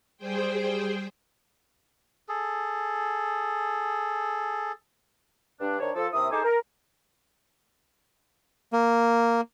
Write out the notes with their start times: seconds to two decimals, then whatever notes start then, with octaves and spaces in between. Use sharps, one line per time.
0.17 G3 G#4 C5 G5
2.29 G#4 A4
5.60 G2 D4
5.80 D#3 D4 C5 C#5
5.95 F3 A4
6.12 D#2 C3 E4 E5 D#6
6.31 D#4 G#4 A4 C5 G#5 D6
6.44 A#4
8.73 A#3